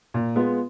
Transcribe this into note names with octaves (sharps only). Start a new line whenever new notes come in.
A#2
G#3 B3 F4